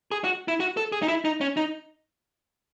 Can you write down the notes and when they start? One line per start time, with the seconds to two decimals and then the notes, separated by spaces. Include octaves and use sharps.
0.11 G#4
0.24 F#4
0.48 E4
0.60 F#4
0.77 A4
0.92 G#4
1.02 D#4
1.08 E4
1.25 D#4
1.41 C#4
1.57 D#4